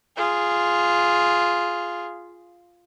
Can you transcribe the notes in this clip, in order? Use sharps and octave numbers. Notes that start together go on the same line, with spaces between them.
F4 G#4